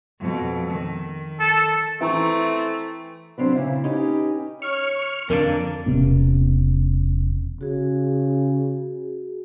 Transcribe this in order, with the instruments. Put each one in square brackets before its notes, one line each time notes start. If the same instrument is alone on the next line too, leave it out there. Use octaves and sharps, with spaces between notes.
[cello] F2 B2
D#3
[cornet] A4
[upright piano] E3 [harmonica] A3 C4 [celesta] E5 A#5 C#6
[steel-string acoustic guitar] F#3 C4 D4 B4
A#2 C#3 E4
C#4 D#4 G4 B4
[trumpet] C#5 [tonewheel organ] C#6 F6
[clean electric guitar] F2 D3 D4 [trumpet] A#3 [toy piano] A#4
[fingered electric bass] E1 C3 B3 C#4
[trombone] C#3 [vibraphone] F#4 G#4